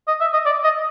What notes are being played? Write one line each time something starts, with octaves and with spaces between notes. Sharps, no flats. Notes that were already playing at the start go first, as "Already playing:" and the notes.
D#5
E5
D#5
D5
D#5